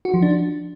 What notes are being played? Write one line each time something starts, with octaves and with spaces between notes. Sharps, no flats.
F#4
F3
D4